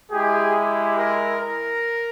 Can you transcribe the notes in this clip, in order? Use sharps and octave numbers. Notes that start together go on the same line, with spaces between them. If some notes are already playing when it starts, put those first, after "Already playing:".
G#3 E4 G4 G#4
G4
A#4
A#4